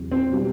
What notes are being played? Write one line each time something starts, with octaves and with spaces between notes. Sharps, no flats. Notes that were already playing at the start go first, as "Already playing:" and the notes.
Already playing: E2 C3 F#3
C4
B2 G3 B3